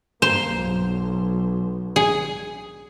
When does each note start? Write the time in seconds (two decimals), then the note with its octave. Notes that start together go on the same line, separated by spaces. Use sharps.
0.22 G2 A#3 C5
0.52 B1
1.96 G#4